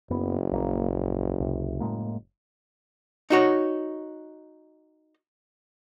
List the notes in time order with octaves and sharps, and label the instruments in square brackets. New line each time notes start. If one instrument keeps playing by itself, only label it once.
[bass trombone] F#1 [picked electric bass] F#2 B3
[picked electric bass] A#1 D3 A#3
A#1
C#2 C3
A2 G#3 A#3
[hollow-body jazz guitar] D#4 F#4 C#5